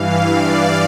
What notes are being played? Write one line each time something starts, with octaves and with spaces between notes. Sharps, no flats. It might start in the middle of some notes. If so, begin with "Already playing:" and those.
Already playing: G2 E3 F5
D5